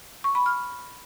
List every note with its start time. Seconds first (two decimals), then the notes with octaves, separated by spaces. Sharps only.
0.24 C#6
0.35 B5
0.46 F6